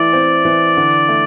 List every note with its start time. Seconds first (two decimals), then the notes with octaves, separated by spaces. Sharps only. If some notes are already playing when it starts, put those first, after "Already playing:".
Already playing: E3 A3 E4 D5
0.13 C4
0.45 E3
0.77 D3
1.09 A3